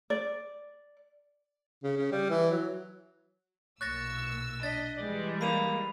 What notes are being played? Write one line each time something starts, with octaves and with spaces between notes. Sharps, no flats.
D5
C#3
C#3
G3
E3
F#3
B1 A#2 C#6 E6 F#6 A6 A#6
D4 D#5 A6 B6
E3 G3 G#3 D5
A#3 B5 D#7 F7